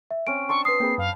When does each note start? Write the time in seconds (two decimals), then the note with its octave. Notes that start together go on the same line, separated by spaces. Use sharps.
0.11 E5
0.27 C4 C#4 D7
0.49 D4 A5 C6 C#6 E6
0.65 B4 D#6 C7
0.80 A#3 C4 G#4 G5 B5
0.98 F#2 F5